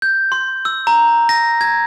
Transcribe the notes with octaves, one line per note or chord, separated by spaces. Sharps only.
G6
C6
E6
A#5
A#6
G#6